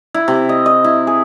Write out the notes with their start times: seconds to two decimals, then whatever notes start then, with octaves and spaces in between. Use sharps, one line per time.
0.14 E4
0.28 C3
0.49 D#5
0.66 D#5
0.84 E4
1.07 G#4